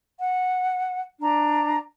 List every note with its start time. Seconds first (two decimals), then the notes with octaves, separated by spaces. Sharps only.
0.20 F#5
1.20 D4 A#5